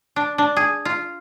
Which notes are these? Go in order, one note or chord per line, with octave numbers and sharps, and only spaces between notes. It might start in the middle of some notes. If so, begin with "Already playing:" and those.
D4
D4
G#4
F4